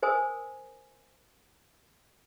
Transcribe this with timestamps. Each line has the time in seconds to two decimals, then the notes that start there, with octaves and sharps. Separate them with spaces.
0.03 A#4 C5 G#5 D#6